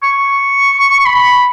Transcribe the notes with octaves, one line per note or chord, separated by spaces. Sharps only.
C#6
B5